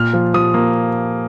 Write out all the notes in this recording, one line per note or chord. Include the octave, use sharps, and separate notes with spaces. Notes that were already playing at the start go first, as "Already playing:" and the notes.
Already playing: A#2 F6
F3
F3 D#6
A#3